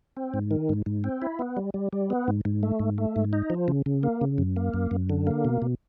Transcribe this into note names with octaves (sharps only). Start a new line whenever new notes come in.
C4
G#2
D#3
G#2
G#2
C4
E4
B3
G3
G3
G3
B3
G#2
G#2
A3
G#2
A3
G#2
D#4
F3
C#3
C#3
A#3
C#3
F#2
A#3
F#2
F#2
D3
A#3
B2
B2